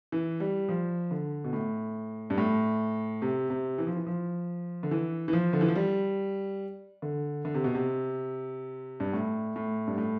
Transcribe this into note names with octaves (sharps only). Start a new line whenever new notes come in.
E3
G3
F3
D3
B2
A2
G2
A2
C3
C3
E3
F3
E3
F3
D3
E3
E3
F3
D3
E3
F3
G3
D3
D3
C3
B2
C3
G2
A2
A2
G2
A2